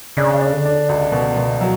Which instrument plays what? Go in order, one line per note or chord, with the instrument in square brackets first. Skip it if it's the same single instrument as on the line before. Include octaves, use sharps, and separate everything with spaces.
[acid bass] C#3 [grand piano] D4
[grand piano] D4
[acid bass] D3
[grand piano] D4
C#2
B2
B2
[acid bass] E3 [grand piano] F#3